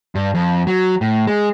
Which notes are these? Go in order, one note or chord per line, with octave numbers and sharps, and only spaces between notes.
G2
F2
F#3
A2
G#3